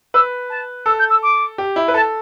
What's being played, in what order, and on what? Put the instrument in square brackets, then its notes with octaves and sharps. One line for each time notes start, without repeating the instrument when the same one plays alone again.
[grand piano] B4 [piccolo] E6
[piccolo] A5
[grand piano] A4 [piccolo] E6
[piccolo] G6
E6
D6
[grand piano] G4
E4
B4
[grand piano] A4 [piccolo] A5